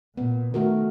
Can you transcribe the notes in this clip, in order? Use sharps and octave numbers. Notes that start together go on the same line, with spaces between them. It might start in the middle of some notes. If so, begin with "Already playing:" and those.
A#2 B3
D#3 A3 F#4 A#4